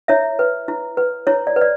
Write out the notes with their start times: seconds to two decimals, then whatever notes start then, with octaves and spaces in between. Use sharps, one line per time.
0.08 E4 C#5 E5
0.39 B4
0.68 E4
0.97 B4
1.27 E4 C#5
1.47 D5
1.56 B4
1.61 D5